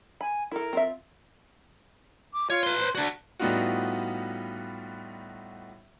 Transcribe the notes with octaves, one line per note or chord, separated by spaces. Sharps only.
G#5 B5
E4 A4 A#4
C4 F4 E5
D6
F4 C#5
B4 C6
C5
D4 F#4 D5
A2 G3 B3 D#4 F4 F#4